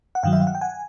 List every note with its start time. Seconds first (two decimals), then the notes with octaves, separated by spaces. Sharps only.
0.15 F#5
0.23 G2 D#3 F#3 F5 G5
0.33 E5
0.40 F5
0.47 F#5
0.55 G5
0.61 F#5 G#5